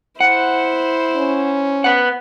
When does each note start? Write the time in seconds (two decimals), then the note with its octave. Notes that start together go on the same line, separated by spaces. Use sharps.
0.20 E4 C5 F#5
1.16 C#4
1.84 B4 F#5